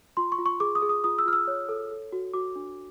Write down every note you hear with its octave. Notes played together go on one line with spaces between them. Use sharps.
F4 C6
C#6
F4
C#6
G#4 D6
D#6
G#4
D#6
F4 D#6
E6
F4 F6
E6
C#5
A4
A4
F#4
F#4 D6
D4